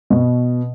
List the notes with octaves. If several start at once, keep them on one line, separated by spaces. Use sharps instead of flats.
B2